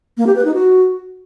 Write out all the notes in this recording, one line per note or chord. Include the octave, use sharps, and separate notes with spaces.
A#3
G4
B4
D#4
F#4